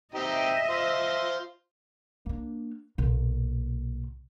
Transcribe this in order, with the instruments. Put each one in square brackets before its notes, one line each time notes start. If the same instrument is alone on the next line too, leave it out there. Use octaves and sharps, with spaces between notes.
[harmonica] C4 D#4 G4 [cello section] D#5 E5
[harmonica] F4 C5
[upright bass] A#3 D4
B1 A#2